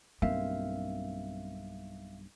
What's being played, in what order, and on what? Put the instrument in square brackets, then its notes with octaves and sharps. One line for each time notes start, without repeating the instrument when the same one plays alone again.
[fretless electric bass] B1 G2 A#3 [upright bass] C4 [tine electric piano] E5 F5